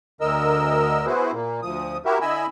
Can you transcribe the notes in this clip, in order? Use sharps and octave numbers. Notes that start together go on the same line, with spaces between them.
D2 D3 A#4 D#5 E6
B3 E4 F#4 G#4 B4 C5
A#2 A#3
D2 F3 D#6
E4 F#4 G4 A#4 E5
D3 E4 D#5 G#5 B5 E6